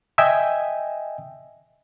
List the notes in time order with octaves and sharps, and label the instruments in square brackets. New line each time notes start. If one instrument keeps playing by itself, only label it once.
[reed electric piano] D#5 E5 G5 G#5